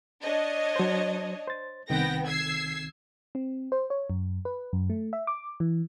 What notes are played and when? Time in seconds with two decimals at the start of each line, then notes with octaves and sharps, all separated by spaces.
0.24 D4 C#5 D#5
0.76 F#3 C5
1.48 C5 A6
1.90 C2 D#3 B3 C4 G5 A#6
2.27 E6 G#6 C7
3.35 C4
3.72 C5
3.90 C#5
4.10 F#2
4.45 B4
4.73 F#2
4.90 A3
5.13 E5
5.27 D6
5.60 E3